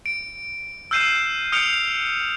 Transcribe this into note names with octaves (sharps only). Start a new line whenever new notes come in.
D7
E6 F6 G6 C7 D#7 E7
D#6 F6 G6 C#7 D7 F7